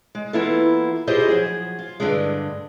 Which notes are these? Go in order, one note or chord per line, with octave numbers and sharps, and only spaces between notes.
G#3
E3 A#3 B3 E4 F4 A4
E4 F4 G4 G#4 C5 D#5
F3 F#3 G#4
F4
G2 D3 G#3